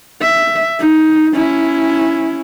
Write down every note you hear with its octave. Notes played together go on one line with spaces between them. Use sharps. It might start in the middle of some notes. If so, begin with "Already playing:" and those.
E5
D#4
C#4 E4